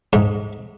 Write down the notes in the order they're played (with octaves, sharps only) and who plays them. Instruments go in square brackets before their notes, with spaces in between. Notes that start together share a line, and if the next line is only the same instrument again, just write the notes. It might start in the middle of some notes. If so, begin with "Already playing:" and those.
[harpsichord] G#2